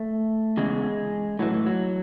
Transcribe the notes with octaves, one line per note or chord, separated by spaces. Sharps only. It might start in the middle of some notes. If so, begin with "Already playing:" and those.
Already playing: A3
E2 C#3 G#3
A2 E3 F#3
E3
F#3